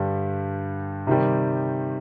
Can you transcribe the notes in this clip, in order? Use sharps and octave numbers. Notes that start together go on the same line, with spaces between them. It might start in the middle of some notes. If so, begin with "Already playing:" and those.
Already playing: G2 D3 G3
C3 D#3 G3